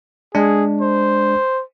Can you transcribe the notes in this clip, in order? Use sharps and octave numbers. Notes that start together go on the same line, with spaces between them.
G#3 D4 G#4
C5